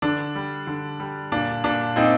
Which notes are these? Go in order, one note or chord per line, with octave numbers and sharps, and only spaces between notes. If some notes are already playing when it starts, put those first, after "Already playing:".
D3 D4
G3
D3
G3
A#2 D4
A#2 D4
A#2 C4 D#4